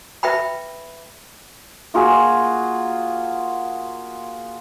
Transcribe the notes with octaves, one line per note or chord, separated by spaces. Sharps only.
B4 E5 G5 B5
A#3 F4 F#4 G#4